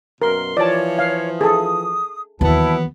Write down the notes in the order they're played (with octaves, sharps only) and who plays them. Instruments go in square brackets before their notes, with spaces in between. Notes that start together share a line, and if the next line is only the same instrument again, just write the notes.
[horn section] F#2 B2 C6 [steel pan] A#4
[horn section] E3 F3 [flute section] C#5 [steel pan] D5 A5
[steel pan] F5
[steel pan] G#4 A4 [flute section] D#6
[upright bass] D#2 E3 [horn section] F#3 B3 [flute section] E4 A5